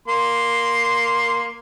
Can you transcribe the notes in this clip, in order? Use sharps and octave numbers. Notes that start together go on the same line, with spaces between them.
A#3 C6